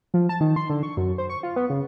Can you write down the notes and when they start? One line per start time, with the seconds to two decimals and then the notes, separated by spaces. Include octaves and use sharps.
0.14 F3
0.29 A5
0.41 D#3
0.56 C6
0.70 D3
0.83 C#6
0.97 F#2
1.18 C5
1.30 C#6
1.43 F4
1.56 B3
1.70 C#3